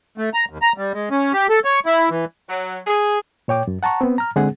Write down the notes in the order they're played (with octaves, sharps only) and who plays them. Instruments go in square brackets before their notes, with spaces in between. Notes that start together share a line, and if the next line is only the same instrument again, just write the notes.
[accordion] A3
A#5
D#2
A#5
G3
G#3
C#4
G4
A4
C#5
E4
E3
[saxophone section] F#3
G#4
[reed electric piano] A#2 C#5 G5 D6
F#2
F#5 A5 A#5 C#6
B3 C4
A#5 F6
D3 G#3 C4 G#4 F#5